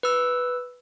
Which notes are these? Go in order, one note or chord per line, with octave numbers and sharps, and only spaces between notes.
B4 E6